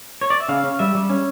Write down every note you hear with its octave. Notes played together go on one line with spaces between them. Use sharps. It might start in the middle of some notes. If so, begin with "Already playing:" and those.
C#5
D5
E5
C#3 F5
C#4
G3 E5
G3
C#4